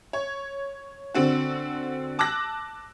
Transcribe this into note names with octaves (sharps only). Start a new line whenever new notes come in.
C#5
D3 C4 F#4
A5 D6 E6 F#6 A#6